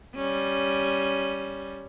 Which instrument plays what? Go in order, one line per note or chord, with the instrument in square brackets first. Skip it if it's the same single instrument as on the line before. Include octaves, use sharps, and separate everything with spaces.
[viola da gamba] G3 C#4